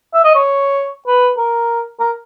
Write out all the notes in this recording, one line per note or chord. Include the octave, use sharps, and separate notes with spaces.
E5
D#5
C#5
B4
A#4
A#4